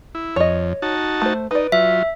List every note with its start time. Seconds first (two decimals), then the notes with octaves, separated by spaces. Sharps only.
0.15 E4
0.36 F2 C#5 D#5
0.82 D#4 F#4 A5
1.22 A3 C5
1.51 D#4 B4 D5
1.72 F#3 F4 E5